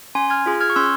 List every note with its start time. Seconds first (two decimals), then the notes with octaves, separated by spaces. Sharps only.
0.15 C#4 G#5 C6
0.30 F6 G#6
0.46 F4 G#4
0.61 F6 G#6
0.70 C#6
0.76 C#4 C6 E6